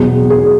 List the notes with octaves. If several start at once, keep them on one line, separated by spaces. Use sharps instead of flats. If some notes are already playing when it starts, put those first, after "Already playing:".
Already playing: E2 B2 F#3 G#4
G#4